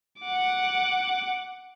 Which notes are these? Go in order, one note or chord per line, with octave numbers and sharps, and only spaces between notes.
F#5 D6